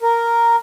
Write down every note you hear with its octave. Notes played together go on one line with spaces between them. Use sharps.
A#4